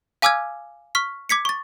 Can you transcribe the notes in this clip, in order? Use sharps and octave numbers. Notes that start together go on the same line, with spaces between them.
F5 G#5 D6 E6 F6 G#6
C#6 F6 B6
D6 G#6 B6 C#7
C#6 A6